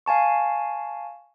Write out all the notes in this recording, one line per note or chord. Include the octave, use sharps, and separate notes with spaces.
F5 G#5 A5 C#6